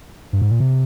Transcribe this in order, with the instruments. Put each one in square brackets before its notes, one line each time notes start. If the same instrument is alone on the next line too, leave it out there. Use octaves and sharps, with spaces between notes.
[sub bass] G2
G#2
A#2
C3